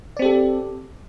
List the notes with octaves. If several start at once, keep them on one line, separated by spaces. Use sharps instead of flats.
C4 G4 A4 D5